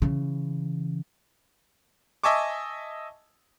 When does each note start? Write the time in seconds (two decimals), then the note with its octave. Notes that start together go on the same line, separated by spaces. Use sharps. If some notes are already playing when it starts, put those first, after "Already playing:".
0.02 C#3 E3
2.24 D#5 E5 G#5 A5 C#6 D6